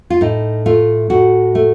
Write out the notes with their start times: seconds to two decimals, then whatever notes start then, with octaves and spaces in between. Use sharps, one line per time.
0.10 F4
0.21 A2 D#4
0.66 A3 F4
1.10 A2 F#4
1.55 A3